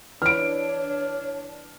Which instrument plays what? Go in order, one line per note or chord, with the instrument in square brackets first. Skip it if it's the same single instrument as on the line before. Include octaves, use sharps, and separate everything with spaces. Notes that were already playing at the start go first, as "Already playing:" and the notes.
[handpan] E3 E4 B4 [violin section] D4 [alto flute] C#5 [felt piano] F6 D7